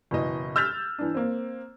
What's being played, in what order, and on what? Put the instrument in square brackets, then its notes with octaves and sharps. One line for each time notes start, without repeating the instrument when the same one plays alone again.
[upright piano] F#1 B2 E3 D#5
E6 F6 G6 A6 B6 F7
E3 D4
A#3 C4